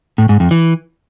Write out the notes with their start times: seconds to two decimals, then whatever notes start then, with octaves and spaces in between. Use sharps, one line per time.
0.18 A2
0.29 G#2
0.40 F2
0.51 E3